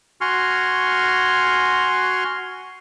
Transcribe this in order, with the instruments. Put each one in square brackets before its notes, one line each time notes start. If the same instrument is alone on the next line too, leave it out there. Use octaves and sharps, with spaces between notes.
[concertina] F#4 G#5 C6 C#6 F6